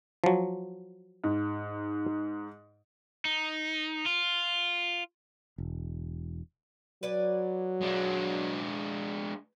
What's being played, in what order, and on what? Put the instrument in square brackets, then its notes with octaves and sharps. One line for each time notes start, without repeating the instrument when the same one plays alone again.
[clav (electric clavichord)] F3 F#3
[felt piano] G#2
[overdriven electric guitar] D#4
F4
[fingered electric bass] E1
[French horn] F#3 [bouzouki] B4 D5 G#5
[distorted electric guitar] G#3 D4